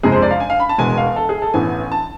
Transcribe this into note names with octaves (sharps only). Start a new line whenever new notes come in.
F2 C3 G#3 G#4
C5
D5
F5
G#5
F5
B5
A5
E1 E2 B2 G#3 B3 G#5
F5
A4
G#4
A4
A1 A2 E3 B3 G#5
A5